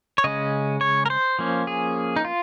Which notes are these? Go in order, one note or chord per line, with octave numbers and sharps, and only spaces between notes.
C#5
C#3 G#3 C#4 D#5
C#5
A#4
C5
F3 A#3 C#4
G#4
D#4
F4